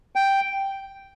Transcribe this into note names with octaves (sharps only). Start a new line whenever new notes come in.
G5